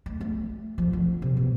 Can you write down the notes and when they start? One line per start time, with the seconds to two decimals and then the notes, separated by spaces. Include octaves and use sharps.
0.06 A3
0.21 A3
0.78 F3
0.93 D3
1.22 C3
1.37 B2